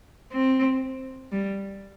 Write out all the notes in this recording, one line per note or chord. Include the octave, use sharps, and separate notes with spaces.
C4
G3